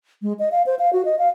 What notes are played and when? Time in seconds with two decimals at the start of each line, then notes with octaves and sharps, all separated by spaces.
0.22 G#3
0.39 D#5
0.52 F5
0.66 C5
0.79 F5
0.93 F#4
1.05 D#5
1.19 F5